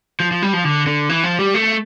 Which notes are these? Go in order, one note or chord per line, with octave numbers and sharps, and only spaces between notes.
F3
F3
G3
F3
D3
D3
E3
F3
G3
A3